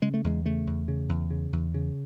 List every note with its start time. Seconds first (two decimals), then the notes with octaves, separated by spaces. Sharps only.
0.02 C#3 G#3
0.14 A3
0.24 E2 G#3
0.45 C#3 A3
0.67 E2
0.88 C#3
1.09 E2
1.30 C#3
1.53 E2
1.74 C#3